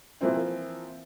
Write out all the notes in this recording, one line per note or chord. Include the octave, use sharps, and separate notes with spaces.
E3 F3 A#3 C4 E4